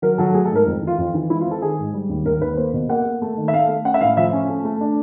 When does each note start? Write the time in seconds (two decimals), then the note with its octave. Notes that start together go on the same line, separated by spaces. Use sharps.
0.02 F#3 A#4
0.18 F#3 A4
0.34 A3 G#4
0.45 A4
0.51 G#2
0.56 A#4
0.66 F2
0.82 E3
0.87 F4
0.98 F2 F4
1.14 E3
1.29 G#3 E4
1.41 F4
1.46 C4
1.51 A4
1.61 D#3 G#4
1.78 G#2
1.94 G3
2.09 D#2
2.25 D#2 A#4
2.41 D#2 B4
2.57 A#3 C5
2.73 B2
2.89 A#3 F#5
3.05 A#3
3.22 A3
3.37 D#3
3.48 E5
3.53 A3 F5
3.69 A3
3.85 C#4 F#5
3.94 E5
4.01 A2 F5
4.17 F3 E5
4.33 C#4
4.49 A3
4.65 A3
4.81 D4